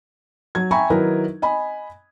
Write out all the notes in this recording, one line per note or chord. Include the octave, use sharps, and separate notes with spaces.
F#3 G#6
E5 G5 G#5 A#5 B5 C#6
D#3 F#3 D#4 E4 A#4 B4
D#5 G#5 B5